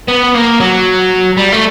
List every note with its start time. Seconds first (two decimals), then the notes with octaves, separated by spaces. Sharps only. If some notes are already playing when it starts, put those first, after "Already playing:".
0.08 B3
0.35 A#3
0.60 F#3
1.37 G3
1.52 A3